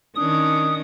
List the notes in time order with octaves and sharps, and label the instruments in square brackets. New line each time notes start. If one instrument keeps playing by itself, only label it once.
[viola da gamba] D#3 C#4 D4 [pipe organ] D#6